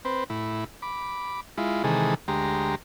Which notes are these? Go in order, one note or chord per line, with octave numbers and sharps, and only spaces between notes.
C4 B4 C5
A2 E4
B5 D6
G#3 E4 F4
C3 D#3 E3 G#3 G#4 A4
D2 G#3 G4 A#5 C6